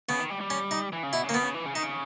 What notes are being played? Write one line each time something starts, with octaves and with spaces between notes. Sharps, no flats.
C#3 B3
D#3
G3
G3
C#4
D#4
E3
C#3
B2 E4
C#3
A#3
B2 B3
C#3
E3
C#3
D#3 D#4
C#3